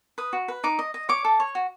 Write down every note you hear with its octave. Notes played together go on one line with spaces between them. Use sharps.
B4 D#6
F#4
B4
D#4 D6
D#5
D#5
C#5 D6
A4
C#5
F#4